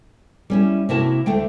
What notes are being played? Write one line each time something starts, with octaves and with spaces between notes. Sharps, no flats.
G3 C#4 E4
C3 A#3 E4 F#4 A#4 A5
D2 D3 A3 G5